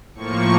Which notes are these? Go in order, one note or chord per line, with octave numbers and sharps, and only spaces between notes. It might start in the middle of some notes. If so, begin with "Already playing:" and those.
A2 F3 A#3 C#6